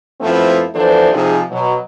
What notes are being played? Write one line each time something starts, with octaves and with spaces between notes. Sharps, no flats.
F#2 F3 A3 B3 C4 E4
E3 F3 B3 D4 A4 C5
C3 F3 D#4 G#4
B2 F#3